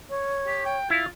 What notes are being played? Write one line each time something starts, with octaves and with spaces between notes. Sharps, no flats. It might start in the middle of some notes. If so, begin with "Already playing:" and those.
C#5
G4
G5
E4 F4